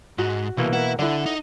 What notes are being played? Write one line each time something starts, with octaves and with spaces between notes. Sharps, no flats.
G#2 F#4
C2 B2 E3 A#3
E4 A#4 F#5
D3 E4 A4 D5 F#5
D#4